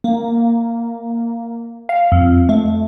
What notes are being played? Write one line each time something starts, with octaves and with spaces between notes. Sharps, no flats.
A#3
F5
F2
A3